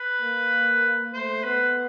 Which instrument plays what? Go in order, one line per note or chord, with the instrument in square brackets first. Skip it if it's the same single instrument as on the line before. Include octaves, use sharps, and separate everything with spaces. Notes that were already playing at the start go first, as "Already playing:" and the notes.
Already playing: [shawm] B4
[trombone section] A#3
[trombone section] A3 [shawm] C5
[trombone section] B3 [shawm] B4